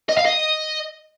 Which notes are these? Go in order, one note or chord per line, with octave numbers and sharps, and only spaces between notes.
D#5
F5
D#5